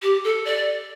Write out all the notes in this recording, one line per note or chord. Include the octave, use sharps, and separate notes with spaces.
G4
A4
D5